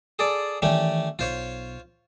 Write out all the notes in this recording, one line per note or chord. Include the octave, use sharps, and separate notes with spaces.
G#4 A4 D5
D#3 E3 G3 A3 C#4
B1 F4 C5 C#5